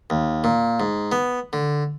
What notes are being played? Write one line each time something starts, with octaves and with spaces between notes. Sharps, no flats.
D#2
A#2
G#2
B3
D3